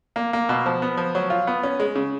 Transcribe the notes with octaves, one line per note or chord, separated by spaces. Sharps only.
A#3
A#3
B2
F3
B3
F3
F#3
F4
B3
C#4
G#3
C#3